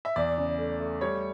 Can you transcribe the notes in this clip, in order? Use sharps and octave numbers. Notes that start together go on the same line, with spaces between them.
E5
E2 D5
C#3
A3
A3
G3 C#5